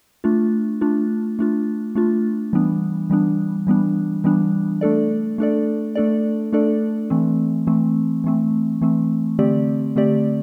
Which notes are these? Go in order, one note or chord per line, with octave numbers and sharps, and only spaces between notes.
A3 D4 F4
A3 D4 F4
A3 D4 F4
A3 D4 F4
E3 G3 B3 D4
E3 G3 B3 D4
E3 G3 B3 D4
E3 G3 B3 D4
A3 D4 A4 D5
A3 D4 A4 D5
A3 D4 A4 D5
A3 D4 A4 D5
E3 A3 C4
E3 A3 C4
E3 A3 C4
E3 A3 C4
D3 A3 C4 G4 D5
D3 A3 C4 G4 D5